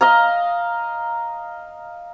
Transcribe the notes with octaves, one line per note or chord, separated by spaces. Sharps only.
D#5 F5 A#5